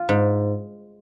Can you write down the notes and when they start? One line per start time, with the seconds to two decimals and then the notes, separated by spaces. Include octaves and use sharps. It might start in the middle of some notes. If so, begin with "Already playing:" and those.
Already playing: F4
0.09 G#2